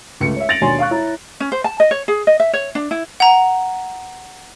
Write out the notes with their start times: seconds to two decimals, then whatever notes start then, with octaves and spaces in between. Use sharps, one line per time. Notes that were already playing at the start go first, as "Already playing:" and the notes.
0.20 C#2 A3 C#7
0.36 C#5 E5
0.49 A6 A#6 D7 F7 F#7
0.61 D#2 B2 D4 C#5 G#5 C6
0.79 F5 C#6 F#6
0.91 E4 C#5 A#5
1.40 C#4
1.52 C5
1.64 A5
1.80 D#5
1.91 C#5
2.08 G#4
2.27 D#5
2.40 E5
2.53 C#5
2.75 D4
2.91 E4
3.20 F#5 A#5